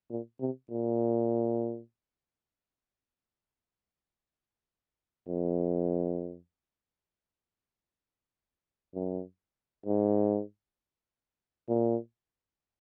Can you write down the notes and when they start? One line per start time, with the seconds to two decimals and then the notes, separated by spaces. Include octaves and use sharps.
0.10 A#2
0.40 C3
0.71 A#2
5.28 F2
8.95 F#2
9.86 G#2
11.69 A#2